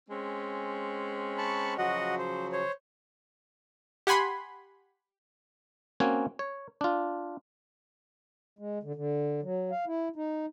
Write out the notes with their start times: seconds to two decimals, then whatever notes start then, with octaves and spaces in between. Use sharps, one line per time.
0.10 G#3 C4 C#4
1.38 A5 B5 C#6
1.78 C#3 F3 F#3 F#4 D#5 F#5
2.19 C5
2.52 C5 C#5
4.07 G4 F#5 G#5 B5 C6
6.00 A#3 C4 C#4 F#4 G#5
6.39 C#5
6.81 D4 F4
8.59 G#3
8.83 D3
8.95 D3
9.43 F#3
9.71 F5
9.87 E4
10.16 D#4